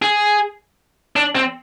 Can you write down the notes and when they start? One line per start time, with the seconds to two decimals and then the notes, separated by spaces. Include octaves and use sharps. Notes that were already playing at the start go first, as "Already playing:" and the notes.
0.02 G#4
1.16 D4
1.35 C4